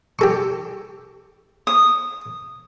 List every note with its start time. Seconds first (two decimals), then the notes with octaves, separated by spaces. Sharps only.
0.19 G4 A4 C#6
1.67 D#6